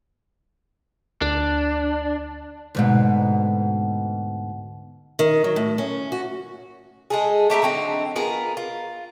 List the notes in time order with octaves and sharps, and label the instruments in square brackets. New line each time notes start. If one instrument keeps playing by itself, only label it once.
[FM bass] D2 [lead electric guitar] D4
[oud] D2 G#2 B2
[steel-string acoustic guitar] D#3
F#3
A2
C#4
F#4
[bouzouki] G#3 A3 G#4
A3 G4 E5 A#5
D3 F#3 C4 D#4
B3 F4 G#4 A#4
F4